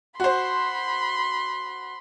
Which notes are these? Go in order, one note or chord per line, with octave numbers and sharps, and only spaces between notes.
F#4 C5 B5 C6